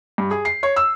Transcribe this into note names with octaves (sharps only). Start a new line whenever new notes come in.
G2
G#4
C7
C#5
E6